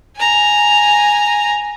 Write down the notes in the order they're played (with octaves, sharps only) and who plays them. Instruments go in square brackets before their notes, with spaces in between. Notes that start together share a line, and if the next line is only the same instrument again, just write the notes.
[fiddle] G#5 A#5